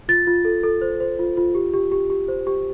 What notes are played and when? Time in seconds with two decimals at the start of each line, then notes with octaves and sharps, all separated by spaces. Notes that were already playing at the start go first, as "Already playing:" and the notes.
0.08 F4 A6
0.27 F4
0.45 A4
0.63 A4
0.82 C5
1.00 C5
1.19 F4
1.37 F4
1.55 G4
1.73 G4
1.91 G4
2.10 G4
2.28 C5
2.47 G4